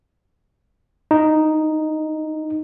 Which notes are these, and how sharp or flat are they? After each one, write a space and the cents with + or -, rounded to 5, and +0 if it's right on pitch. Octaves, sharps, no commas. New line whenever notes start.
D#4 +0